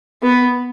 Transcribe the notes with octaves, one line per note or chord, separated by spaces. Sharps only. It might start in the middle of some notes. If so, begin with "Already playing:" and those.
B3